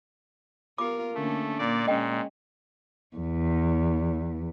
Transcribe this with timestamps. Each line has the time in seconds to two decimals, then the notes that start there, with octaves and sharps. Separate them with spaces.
0.78 B3 F4 G4 A#4 D6
1.14 D3 A3 A#3 C#4
1.58 A#2 A#3 D5
1.87 A#2 G#3 C#4 D#5 G5
3.16 E2